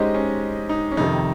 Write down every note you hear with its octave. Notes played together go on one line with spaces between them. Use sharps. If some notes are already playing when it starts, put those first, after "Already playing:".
Already playing: G#3 C#4 D#4 G4 C5 D#5
C#4
D#4
C#4
F2 C3 D#3 D#4